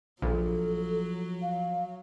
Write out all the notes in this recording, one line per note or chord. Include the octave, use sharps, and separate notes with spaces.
A#1 F3 F#3 A4
F5